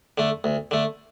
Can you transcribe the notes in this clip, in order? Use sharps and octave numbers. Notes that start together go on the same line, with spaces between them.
D3 A3
D2
D3 A3